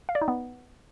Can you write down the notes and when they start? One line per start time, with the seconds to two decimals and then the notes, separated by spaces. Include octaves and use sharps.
0.09 F5
0.15 D5
0.22 D#4
0.28 B3